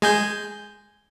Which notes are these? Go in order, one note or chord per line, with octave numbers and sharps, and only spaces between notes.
G#3 G#5 G6